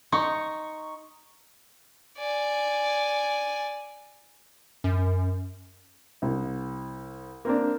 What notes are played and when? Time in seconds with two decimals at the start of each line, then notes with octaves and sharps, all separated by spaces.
0.12 D#4 C#6
2.18 D5 G#5
4.84 F#2
6.22 C2
7.45 A#3 C4 D4